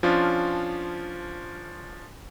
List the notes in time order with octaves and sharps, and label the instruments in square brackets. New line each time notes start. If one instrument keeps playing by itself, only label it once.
[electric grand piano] F3 C#4 D4 F4